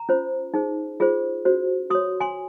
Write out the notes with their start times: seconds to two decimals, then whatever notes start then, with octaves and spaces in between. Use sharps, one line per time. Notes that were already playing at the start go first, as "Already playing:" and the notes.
Already playing: A#5
0.09 C#4 F4 C5
0.54 D#4 G#4 C5
1.00 F4 G#4 C5
1.45 C#4 F#4 C5
1.90 F#4 C#5 C6 D#6
2.20 G#5 C6